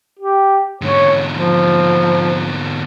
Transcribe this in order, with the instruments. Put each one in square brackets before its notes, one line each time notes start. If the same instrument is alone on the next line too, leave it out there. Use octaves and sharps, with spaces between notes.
[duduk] G4
[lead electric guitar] G#2 D3 [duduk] C#5
[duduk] F3